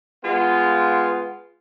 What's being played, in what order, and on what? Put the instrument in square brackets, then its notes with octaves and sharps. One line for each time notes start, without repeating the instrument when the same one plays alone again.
[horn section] G#3 B3 F4